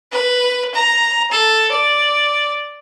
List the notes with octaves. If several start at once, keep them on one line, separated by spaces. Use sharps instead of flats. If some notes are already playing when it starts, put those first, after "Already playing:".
B4
A#5
A4
D5